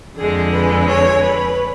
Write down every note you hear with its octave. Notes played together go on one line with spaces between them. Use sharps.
F2 D3 G#3 G#4
B4
C#5
B4